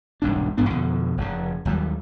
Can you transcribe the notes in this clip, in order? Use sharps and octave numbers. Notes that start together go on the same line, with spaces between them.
E1 C2 G#2 D4
A1 G2 B3 D4
F2 B2 D3 F3
F1 C#3
D#2 F#3 G3